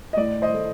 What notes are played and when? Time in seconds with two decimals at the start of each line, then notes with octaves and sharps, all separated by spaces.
0.13 D#5
0.17 A2 D5
0.42 C5 D#5
0.54 A3